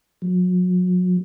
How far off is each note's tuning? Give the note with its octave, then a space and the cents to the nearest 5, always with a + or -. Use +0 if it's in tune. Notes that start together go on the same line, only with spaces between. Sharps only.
F#3 -35